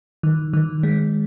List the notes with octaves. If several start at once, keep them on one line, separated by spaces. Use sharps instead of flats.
D#3
D#3
G#3